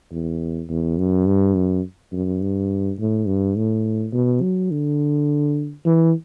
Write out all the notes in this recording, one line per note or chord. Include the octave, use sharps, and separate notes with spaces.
E2
E2
F#2
G2
F#2
F#2
G2
A2
G2
A2
B2
F#3
D3
E3